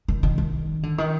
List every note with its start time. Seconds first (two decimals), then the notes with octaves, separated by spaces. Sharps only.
0.08 D#3
0.23 D#3
0.38 D#3
0.83 D3
0.98 D#3